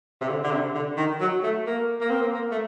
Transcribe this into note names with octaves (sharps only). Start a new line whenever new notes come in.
C3
D3
D3
C3
D3
D#3
F#3
A3
A#3
A#3
C4
A#3
A#3
A3